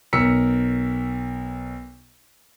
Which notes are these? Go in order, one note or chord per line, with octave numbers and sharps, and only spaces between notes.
B1 A#4 E6 B6 C#7